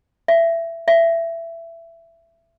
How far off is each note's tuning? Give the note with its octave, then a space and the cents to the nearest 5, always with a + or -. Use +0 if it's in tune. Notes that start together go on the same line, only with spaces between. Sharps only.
E5 +20
E5 +20